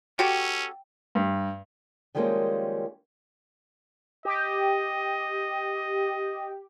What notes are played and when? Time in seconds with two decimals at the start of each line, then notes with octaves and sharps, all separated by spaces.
0.19 C#4 F#4 G4 A4 G5
1.15 G2
2.15 D#3 F3 G3 G#3 A#3 C#4
4.25 G4 D#5